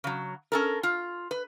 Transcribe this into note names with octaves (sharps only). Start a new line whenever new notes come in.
C#3 F#3
C#4 A4 A#4
F4
B4